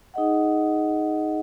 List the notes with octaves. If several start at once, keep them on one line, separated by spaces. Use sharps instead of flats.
D#4 G#4 D#5 F#5